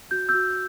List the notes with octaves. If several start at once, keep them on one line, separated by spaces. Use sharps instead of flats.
F#4 G6
E6 G6
F#4